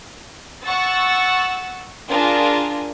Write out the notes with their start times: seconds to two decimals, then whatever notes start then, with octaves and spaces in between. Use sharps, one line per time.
0.63 F#5 C#6 E6 A6
2.10 D4 F4 G#4 A#4